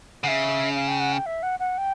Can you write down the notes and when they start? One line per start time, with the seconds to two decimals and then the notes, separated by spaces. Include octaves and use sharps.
0.23 C#3 E5 F#5
0.75 F5
0.88 G5
1.00 F#5
1.13 G5
1.26 E5
1.43 F#5
1.60 F#5
1.78 G5